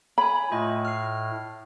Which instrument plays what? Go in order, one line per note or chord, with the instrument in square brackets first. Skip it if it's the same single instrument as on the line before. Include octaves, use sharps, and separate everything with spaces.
[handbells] C#5 G#5 [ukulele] B5
[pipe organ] A2 [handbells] A3 F4 D#5
[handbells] F6 C7